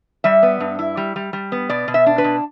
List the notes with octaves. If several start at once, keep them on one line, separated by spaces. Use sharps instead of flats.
G3 E5
B3
G2
E4
G3
G3
G3
B3
B2 D5
B2
E5
D4
B4
B2